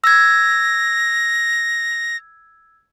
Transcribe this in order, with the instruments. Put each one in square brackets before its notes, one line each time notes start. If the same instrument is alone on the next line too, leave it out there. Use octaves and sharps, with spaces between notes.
[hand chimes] E6 G#6 [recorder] A#6